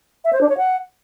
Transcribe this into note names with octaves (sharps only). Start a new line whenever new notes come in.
E5
C5
D4
C#5
F#5